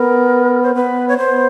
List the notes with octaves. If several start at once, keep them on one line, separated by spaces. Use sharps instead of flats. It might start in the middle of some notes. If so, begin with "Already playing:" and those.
Already playing: B3 A#4
C5
B3 B4
C#5
B3 C5